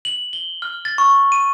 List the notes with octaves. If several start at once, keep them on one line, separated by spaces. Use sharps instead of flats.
F#7
G7
F6
A6
C#6
D#7